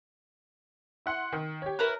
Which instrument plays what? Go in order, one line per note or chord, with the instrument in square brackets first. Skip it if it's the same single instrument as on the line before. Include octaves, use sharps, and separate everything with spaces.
[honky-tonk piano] E4 F#5 C6
D#3
G4 C#5
[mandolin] E4 A#4 B4